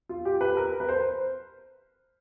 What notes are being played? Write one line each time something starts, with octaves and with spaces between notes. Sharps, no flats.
F4
G4
B4
A#4
B4
C5